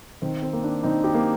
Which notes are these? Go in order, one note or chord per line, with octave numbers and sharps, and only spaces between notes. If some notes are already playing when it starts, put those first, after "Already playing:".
D#3 C4
C4
A#3
D4
D#3 C4 D#4
D#4 G4
A#3